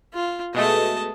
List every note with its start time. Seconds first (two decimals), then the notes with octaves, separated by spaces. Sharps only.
0.14 F4
0.54 B2 G#3 A3 D#5 A5